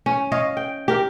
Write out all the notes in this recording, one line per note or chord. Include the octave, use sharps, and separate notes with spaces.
C#4
C#5 D#5 F5
G5
G4 A#4